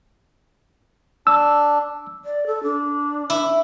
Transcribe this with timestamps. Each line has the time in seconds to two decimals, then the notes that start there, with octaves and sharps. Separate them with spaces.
1.27 D4 E6
2.25 D5
2.47 A4
2.63 D4
3.30 E4